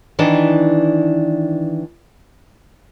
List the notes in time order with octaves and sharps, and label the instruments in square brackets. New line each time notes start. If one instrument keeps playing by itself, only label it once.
[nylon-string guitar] D#3 E3 D4 D#4